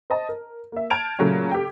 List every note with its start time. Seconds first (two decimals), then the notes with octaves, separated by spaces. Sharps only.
0.10 C5 D#5 A5
0.29 A#4
0.72 A#3 E5
0.90 A5 F6 G6 G#6 D7 F7
1.19 A#2 C#3 F#3 A3 C#4
1.51 G4 A4 G5